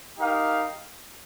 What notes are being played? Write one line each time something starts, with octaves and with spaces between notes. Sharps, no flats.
D#4 G4 A#4 F5